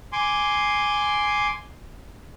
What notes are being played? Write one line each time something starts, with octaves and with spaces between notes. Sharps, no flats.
G#5 C6 D6